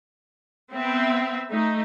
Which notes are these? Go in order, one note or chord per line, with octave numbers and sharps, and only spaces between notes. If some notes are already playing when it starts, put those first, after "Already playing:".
B3 C4 E5
A3 D#4